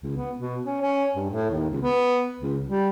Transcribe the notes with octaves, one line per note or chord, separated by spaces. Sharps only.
C#2
B3
B2
C#4
C#4
G2
A2
D#2
C#2
B3
C#2
G3